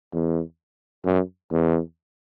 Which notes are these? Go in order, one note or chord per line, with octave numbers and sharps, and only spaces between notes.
E2
F#2
E2